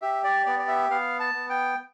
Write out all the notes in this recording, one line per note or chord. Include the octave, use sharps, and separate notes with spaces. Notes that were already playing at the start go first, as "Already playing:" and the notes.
G4 E5
D5
B3 D5
D5
E5
B3 F5
A5
B3
G5